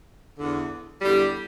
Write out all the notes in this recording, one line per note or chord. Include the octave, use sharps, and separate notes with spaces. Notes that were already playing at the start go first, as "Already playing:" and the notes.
E2 D3
E2 D3 G3